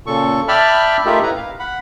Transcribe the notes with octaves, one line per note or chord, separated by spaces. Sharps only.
A#2 C#3 A4 C#6
D5 E5 G5 A5 B5 F6
A3 D#4 F4 G4 A#4 E5
A2 E4 B4 A#5
F5
F#5 B5